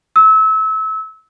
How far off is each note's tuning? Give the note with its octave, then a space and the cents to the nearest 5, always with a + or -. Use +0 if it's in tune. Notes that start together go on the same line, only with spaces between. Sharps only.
E6 -30